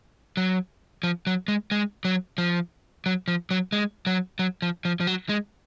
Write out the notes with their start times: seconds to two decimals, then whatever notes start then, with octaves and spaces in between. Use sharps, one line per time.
0.37 F#3
1.03 F3
1.27 F#3
1.48 G#3
1.71 G#3
2.05 F#3
2.38 F3
3.06 F#3
3.28 F3
3.51 F#3
3.72 G#3
4.06 F#3
4.39 F#3
4.62 F3
4.85 F3
5.00 F3
5.07 F#3
5.29 G#3